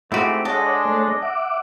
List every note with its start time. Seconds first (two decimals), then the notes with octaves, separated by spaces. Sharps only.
0.12 G#2 A3 C4 E4 F#4 G4
0.45 G#3 D4 A4 C#5 D#5 F#5
0.85 A3 C#5
1.22 E5 F#5 D6